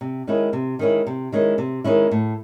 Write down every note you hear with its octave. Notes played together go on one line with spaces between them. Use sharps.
C3
D#3 G#3 C#4 E4
C3
D#3 G#3 C#4 E4
C3
D#3 G#3 C#4 E4
C3
D#3 G#3 C#4 E4
A2